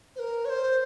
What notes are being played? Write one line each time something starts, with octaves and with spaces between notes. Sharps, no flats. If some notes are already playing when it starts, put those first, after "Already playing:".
C5
A#4
C#5
C5